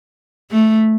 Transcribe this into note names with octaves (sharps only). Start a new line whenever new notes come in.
A3